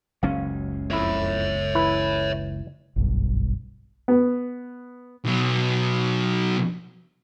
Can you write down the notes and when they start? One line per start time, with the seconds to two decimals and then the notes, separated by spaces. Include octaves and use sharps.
0.23 F#1 C#2 C#4 F5
0.91 F2 E4 C#5 E5
1.75 E3 E4 B4
2.96 F#1 B1 G2
4.08 B3
5.25 B1 B2